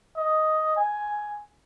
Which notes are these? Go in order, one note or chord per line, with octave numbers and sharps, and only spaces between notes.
D#5
G#5